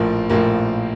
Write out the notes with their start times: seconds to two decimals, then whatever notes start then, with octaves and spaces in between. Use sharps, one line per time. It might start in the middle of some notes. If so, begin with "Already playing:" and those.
Already playing: A#1 A2 F3 A#3
0.30 A#1 A2 F3 A#3